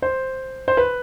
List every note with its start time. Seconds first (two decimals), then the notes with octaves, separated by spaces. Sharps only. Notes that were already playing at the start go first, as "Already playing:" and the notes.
0.02 C5
0.68 C5
0.77 B4